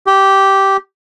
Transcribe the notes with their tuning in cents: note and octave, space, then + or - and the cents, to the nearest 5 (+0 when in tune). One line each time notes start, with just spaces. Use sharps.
G4 -10